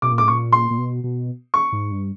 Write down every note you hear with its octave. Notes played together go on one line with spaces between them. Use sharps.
B2 D6
A#2
A2 D6
A#2 C#6
C6
A#2
B2
B2
C#6
G#2
G2